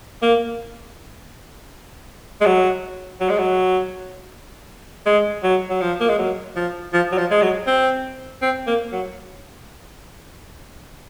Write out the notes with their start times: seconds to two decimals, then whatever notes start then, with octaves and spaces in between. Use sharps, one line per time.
0.22 A#3
2.41 G#3
2.46 F#3
3.20 F#3
3.30 G#3
3.38 F#3
5.06 G#3
5.44 F#3
5.70 F#3
5.81 F3
6.01 A#3
6.09 G#3
6.18 F#3
6.56 F3
6.94 F3
7.12 F#3
7.18 F3
7.31 G#3
7.42 F#3
7.67 C4
8.42 C4
8.67 A#3
8.92 F#3